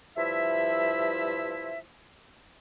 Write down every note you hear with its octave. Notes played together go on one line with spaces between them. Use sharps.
G2 F3 E4 E5